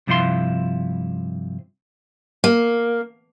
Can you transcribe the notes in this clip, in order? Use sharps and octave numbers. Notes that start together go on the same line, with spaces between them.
G2 C3 F3 E4 F5 C6
A#3